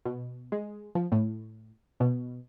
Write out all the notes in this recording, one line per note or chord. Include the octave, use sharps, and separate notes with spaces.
B2
G#3
F3
A2
B2